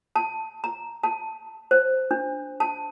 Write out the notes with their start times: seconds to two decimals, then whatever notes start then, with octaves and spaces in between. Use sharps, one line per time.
0.16 A5
0.64 A#5
1.04 A5
1.71 C5
2.11 D4
2.60 A5